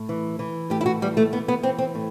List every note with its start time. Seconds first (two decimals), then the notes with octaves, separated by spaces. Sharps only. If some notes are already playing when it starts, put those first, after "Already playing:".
Already playing: A2
0.09 E3
0.39 E3
0.70 A2 G4
0.81 E4
0.86 F#4
1.02 E3 G3
1.17 A3
1.32 E3 B3
1.48 B3
1.63 E3 C4
1.78 C4
1.95 A2